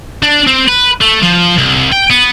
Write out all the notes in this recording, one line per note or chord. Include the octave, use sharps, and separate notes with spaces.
D4
C4
B4
A3
F3
C2
G5
B3